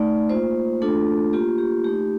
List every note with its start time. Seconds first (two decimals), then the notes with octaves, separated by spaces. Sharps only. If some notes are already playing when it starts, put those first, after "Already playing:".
Already playing: A3 D#4 D5
0.30 A#3 F4 C5
0.81 A3 D4 F4 A4
1.33 A#3 F4 G4
1.58 G4
1.84 A3 G4
1.88 D#4